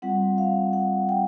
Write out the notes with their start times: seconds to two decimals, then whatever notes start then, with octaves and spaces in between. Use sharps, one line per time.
0.02 G3 C4 F4 F#5
0.38 F5
0.73 F#5
1.09 G5